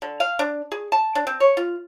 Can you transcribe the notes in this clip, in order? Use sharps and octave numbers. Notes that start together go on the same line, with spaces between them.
D3
F5
D4
G#4
A5
D4
C4
C#5
F4